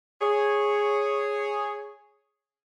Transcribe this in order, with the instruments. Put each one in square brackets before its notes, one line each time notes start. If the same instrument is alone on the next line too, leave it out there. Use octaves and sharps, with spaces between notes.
[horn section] G#4 C#5